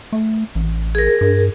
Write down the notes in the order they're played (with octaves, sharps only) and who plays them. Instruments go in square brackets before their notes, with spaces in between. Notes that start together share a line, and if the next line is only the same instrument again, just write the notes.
[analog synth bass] A3
A1
[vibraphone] G#4 A#4
[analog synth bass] G2